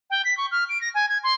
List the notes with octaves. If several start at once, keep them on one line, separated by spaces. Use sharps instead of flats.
G5
B6
C#6
F6
D7
A#6
G#5
G#6
C6